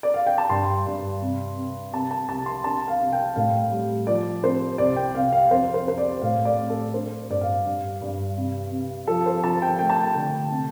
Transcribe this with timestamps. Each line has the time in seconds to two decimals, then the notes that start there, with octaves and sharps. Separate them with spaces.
0.03 D5
0.14 F5
0.26 G5
0.38 A5
0.50 G2 C6
0.86 G2
1.22 C3
1.57 C3
1.94 C3 A5
2.11 A5
2.28 C2 A5
2.46 C6
2.64 D4 A5
2.88 F5
3.00 C3
3.12 G5
3.36 A2 F5
3.71 G3
4.07 F3 D5
4.43 C4 C5
4.78 C2 D5
4.96 G5
5.15 C3 F5
5.33 F5
5.51 F2 C5
5.74 C5
5.87 C4 C5
5.98 D5
6.22 A2 F5
6.45 D5
6.57 C4
6.70 A4
6.94 D4 C5
7.29 G2 D5
7.41 F5
7.65 G2
8.01 G2
8.37 C3
8.71 C3
9.07 F3 A4
9.26 C5
9.44 F3 A5
9.62 G5
9.79 A3 G5
9.90 A5
10.00 G5
10.15 D3
10.51 C3